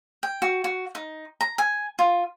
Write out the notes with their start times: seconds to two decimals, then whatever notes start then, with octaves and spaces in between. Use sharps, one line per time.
0.23 G5
0.42 F#4
0.64 F#4
0.95 D#4
1.41 A#5
1.58 G#5
1.99 F4